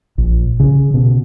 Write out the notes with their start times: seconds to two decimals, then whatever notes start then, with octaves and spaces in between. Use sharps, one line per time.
0.18 A#1
0.60 C#3
0.94 B2